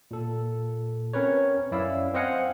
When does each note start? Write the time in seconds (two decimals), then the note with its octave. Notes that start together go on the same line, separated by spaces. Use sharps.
0.11 A#2 A4
1.13 C4 C#4 A#4 B4 C#5
1.71 F#2 C#4 E4 D5 F5 E6
2.14 C4 C5 D#5 F5 F#5 G#5